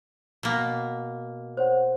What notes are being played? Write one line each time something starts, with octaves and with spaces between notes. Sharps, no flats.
B2 A#3
C5 C#5 F#5